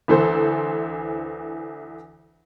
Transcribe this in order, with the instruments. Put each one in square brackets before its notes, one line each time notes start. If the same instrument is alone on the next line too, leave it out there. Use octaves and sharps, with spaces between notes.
[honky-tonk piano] D2 E3 A4 C5